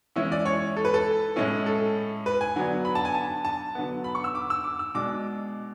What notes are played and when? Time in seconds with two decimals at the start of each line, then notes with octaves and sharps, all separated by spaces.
0.16 E3 G#3 C#4 E4 E5
0.32 D5
0.45 C#5
0.77 A4
0.85 B4
0.94 A4
1.36 A2 G#3 C#4 E4
1.66 A4
2.26 B4
2.41 G#5
2.56 D3 F#3 B3 D4
2.85 B5
2.95 A5
3.05 G#5
3.15 A5
3.45 A5
3.75 D3 F#3 B3
4.04 B5
4.15 C#6
4.24 E6
4.35 D6
4.50 E6
4.64 D6
4.79 E6
4.95 B2 G#3 D4 D6